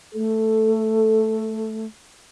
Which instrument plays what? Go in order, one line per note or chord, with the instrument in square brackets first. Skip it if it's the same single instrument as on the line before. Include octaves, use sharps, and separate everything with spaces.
[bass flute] A3 [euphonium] A4